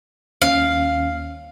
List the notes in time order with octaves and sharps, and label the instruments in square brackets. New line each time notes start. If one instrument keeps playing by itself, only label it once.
[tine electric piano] D#2 C#4 [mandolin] F5